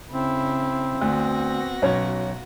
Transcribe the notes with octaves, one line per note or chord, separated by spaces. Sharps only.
C#3 C4 E4
D2 B3 F#4 A#6
B1 C#4 C#5